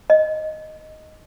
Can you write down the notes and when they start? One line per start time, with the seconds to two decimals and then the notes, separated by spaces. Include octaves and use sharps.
0.10 D#5